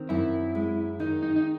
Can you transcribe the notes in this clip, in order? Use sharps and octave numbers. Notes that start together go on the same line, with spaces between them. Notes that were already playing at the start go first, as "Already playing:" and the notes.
Already playing: D#3 C4
F#2 E4
G#3
D#3 D#4
D#4
D#4